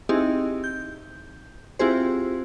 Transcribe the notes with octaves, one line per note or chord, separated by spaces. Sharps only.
C4 D#4 E4 G4 G#4 D#5
G6
C4 E4 F4 G4 G#4 C5